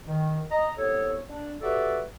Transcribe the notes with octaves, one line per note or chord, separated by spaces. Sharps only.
D#3
D#5 A#5
C2 B3 A4 C#5
D4
F#4 G4 A4 B4 D5 E5